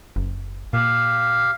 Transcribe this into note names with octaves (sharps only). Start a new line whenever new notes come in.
F#1
A#2 G4 F5